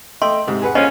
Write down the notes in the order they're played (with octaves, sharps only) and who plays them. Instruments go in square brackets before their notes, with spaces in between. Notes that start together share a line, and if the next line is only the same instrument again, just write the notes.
[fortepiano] A3 E5 G5 [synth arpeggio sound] D#5 [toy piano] C6
[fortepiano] G#2 C3
G#4 B4 F#5
[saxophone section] D3 F3 C#4 [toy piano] D#5 [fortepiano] G#5 [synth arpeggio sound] D#7